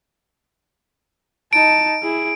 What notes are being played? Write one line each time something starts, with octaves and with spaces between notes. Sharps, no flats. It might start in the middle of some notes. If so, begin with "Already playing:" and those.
D#4 A5 D7
E4 G#4